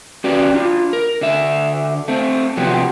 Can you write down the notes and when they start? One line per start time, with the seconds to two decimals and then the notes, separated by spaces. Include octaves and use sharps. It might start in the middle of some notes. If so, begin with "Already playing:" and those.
0.24 C#4 F#4 G4 B4 D5
0.54 D4 F4
0.93 A#4
1.21 D3 E5
2.08 A3 C4
2.57 C3 F3 F#3 B3 G4